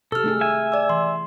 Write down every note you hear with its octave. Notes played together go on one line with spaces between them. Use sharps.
C3 G4 A4 E6 F6
A3 D#4 G#4
E5 G#5
D5 D6 E6
E3 C6